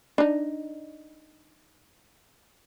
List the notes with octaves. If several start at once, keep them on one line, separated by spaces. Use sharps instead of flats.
D4 D#4